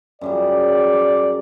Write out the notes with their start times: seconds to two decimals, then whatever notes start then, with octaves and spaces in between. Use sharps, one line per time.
0.21 F#2 C#3 G3 D5